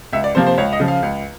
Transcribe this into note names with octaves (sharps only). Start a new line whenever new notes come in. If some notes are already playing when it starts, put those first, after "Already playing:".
C#2 E5
D5
C3 F3 A#3 C5
C5
C#2 C#5
D#5
C#3 F3
F5
C#2